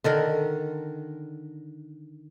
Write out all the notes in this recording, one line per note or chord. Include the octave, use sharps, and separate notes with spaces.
D3 D#3 A#4